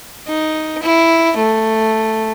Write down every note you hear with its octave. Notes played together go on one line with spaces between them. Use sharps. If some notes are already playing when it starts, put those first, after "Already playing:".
D#4
E4
A3